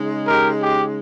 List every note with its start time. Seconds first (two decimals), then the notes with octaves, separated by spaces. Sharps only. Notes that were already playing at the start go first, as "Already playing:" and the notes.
Already playing: C#3 G#3 D#4
0.27 G4 A#4
0.61 G4